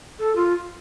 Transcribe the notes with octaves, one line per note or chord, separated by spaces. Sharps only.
A4
F4